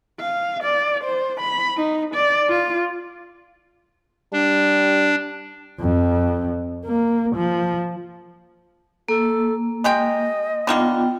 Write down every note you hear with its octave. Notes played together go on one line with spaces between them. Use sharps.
F5
D5
C5
B5
D#4
D5
F4
G3 D4
F2
A#3
F3
A#3 A4
G#3 G4 D#5 G5
D3 D#3 A#3 B3 F4 G5